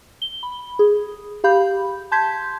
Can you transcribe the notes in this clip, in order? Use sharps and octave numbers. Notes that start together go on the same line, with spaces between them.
G7
B5
G#4
G4 F5 B5 G6
A5 C6 G6 G#6 B6